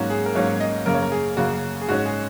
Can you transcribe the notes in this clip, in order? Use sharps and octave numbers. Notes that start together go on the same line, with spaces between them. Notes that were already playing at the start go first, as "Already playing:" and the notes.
Already playing: G#2 F#3 A#3 C#4 F#4
G#4
A#4
G#2 F#3 A#3 C#4 C#5
D#5
F#2 C#3 A#3 A#4
C#5
A#4
G#4
F#2 C#3 A#3 F#4
G#4
G#2 G#3 C#4 F#4
G#4